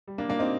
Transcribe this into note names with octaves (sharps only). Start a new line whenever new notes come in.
G3
A#3 D4
A#2 A#3 D4
C4 D#4